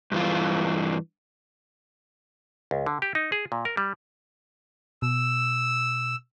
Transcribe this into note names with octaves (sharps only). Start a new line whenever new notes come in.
G2 E3 F4
C#2
D3
G4
D#4
G#4
A#2
A#4
G3
B2 E6